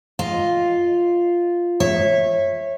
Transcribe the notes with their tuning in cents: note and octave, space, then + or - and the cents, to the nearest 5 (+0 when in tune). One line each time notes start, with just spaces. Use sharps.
F4 +0 D#5 +0
C#5 -20 E5 +0